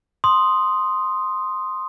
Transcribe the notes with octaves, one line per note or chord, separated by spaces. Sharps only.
C6 D#6